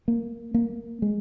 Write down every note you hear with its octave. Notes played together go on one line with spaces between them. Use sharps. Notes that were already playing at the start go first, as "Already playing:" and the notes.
A#3
A#3
G#3